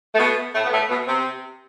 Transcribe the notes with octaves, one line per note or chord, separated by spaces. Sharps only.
A3
B2 B3
A2 A3
B3
A2 A3
B2 B3
C3 C4